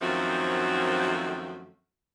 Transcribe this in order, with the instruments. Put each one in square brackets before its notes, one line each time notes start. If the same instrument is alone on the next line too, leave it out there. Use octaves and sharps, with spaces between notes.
[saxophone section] F#2 D#3 F3 A3 C4 F#4